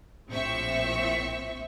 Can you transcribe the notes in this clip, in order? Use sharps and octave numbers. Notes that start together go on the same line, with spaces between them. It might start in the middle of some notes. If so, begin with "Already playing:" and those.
A#1 A2 F3 C4 E5 C#6